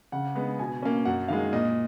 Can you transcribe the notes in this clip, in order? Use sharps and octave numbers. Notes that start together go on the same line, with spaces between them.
C#3 F#5
G#3 B3
B2 G#5
A#3 C#4
F#2 F#5
D#3 G#3 F5
A#2 D#5